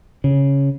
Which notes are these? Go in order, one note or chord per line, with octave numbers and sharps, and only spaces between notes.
C#3